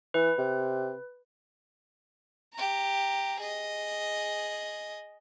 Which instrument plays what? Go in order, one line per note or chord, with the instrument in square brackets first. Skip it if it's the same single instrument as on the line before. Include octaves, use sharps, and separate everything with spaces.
[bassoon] E3 [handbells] B4
[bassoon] C3
[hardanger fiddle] G4 A#5
G#4 D#5